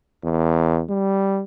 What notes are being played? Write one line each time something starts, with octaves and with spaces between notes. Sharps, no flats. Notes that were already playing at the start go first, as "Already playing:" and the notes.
E2
G3